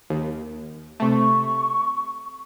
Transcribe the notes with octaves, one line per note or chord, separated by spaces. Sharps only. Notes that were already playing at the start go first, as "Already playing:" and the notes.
D#2
C3 A3 C#6